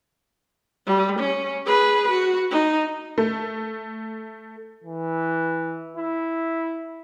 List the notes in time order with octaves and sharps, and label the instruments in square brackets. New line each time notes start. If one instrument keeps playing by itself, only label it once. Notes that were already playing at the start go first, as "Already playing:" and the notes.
[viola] G3
C#4
G#4 B4
F#4
D#4
[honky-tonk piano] A3
[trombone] E3
E4